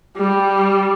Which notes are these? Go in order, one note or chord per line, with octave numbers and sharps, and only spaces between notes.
G3